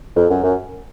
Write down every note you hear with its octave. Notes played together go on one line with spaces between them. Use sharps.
F2
F#2
F#2